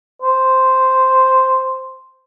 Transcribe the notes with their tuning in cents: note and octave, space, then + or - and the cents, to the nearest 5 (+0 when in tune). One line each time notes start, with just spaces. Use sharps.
C5 -5